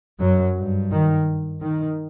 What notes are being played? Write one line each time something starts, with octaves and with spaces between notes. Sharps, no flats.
F#2 F#3
G2
D#3
D#3